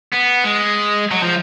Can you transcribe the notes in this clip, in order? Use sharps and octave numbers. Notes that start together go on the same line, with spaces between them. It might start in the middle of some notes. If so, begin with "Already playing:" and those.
B3
G#3
F#3
F3